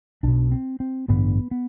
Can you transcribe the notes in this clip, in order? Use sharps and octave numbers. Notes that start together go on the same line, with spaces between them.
B1 B2 D4
C4
C4
A1 G2 D3 B3
B3